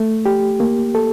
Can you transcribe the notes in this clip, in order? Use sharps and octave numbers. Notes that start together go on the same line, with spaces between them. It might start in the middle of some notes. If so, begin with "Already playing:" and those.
Already playing: A3
G4
A#3
A4